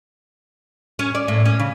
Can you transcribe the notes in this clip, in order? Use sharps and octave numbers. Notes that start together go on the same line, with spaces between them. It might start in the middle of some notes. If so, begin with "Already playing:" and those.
C#4
D5
A2
C#4
C#3